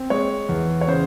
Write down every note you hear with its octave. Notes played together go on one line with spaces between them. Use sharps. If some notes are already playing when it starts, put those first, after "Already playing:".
Already playing: C4
G#3 C#5
E2
C#5
C#3 C5